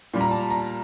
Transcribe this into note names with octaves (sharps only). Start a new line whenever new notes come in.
A#2 G3
A#5
A5
A#5